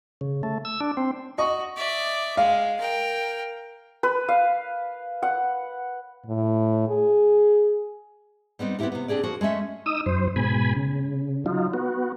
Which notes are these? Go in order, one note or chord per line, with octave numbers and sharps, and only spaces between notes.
C#3
A3
E6
D4
C4
F#4 D#5 C#6 D#6
D5 E5
G#3 F5
A#4 G5
B4
F5
F#5
A2
G#4
G3 B3 C4 D#4
B3 C4 D4 E4 G4 A#4
C3 B3
C4 D4 G4 G#4 D5
F3 F#4 A#4
G#3 A3 C#4 E5
D#4 D#6 E6
F#2 C5
G#2 B2 G#5 B5
C#3
F#3 D#4 F4
B3 F#4